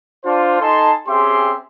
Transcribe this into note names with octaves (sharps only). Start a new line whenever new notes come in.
D4 F4 C5
D#4 A4 G#5 A5 C6
C4 C#4 G4 G#4 E5 C6